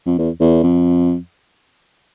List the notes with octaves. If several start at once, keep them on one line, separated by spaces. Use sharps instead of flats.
F2
E2
E2
F2